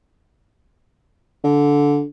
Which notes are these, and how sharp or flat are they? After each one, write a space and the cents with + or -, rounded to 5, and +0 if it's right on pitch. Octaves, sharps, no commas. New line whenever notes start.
D3 -15